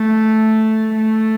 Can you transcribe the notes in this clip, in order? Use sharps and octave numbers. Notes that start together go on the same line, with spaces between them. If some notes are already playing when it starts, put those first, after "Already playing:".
Already playing: A3
A3